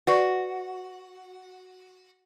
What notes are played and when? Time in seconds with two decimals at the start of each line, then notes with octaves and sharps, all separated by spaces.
0.07 F#4 B4 D5 C#6